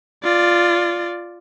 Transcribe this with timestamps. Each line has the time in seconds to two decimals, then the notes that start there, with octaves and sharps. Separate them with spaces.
0.24 F4 D5